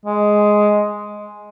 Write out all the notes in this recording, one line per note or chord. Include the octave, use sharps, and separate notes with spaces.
G#3